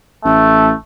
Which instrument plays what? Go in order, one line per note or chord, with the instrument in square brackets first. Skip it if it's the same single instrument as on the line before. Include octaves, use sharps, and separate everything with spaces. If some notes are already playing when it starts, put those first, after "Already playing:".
[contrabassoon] A1 [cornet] A3